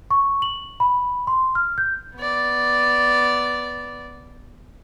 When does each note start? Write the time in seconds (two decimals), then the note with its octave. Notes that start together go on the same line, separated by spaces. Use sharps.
0.11 C#6
0.42 F#7
0.80 B5
1.27 C6
1.55 F6
1.78 G6
2.16 B3 D5